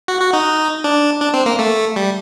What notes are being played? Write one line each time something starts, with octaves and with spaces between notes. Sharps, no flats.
F#4
F#4
D#4
D4
D4
C4
A#3
A3
G3